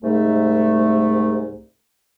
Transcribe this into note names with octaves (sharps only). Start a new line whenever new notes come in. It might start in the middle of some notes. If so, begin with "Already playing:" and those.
C2 G#2 A3